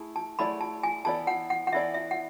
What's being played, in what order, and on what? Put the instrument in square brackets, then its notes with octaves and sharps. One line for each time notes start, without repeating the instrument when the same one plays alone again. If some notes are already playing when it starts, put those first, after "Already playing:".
Already playing: [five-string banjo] A3 E4 G#4
[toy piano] A5
[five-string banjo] F#3 A3 E4 G#4 D5 [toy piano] B5
[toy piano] A5
G#5
[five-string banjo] E3 B3 E4 A4 D5 [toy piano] A5
[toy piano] F#5
F#5
F#5
[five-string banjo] E3 B3 E4 A4 D5 [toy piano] E5
[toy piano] E5
F#5